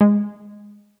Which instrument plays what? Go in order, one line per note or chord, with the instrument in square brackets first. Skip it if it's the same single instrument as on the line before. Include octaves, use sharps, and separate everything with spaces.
[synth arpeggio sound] G#3